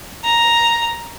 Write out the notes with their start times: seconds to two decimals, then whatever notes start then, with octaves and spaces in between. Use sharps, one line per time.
0.24 A#5